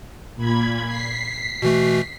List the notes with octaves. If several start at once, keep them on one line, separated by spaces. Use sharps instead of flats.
A#2 B5 G#6
B6 C7
B2 E3 A3 F#4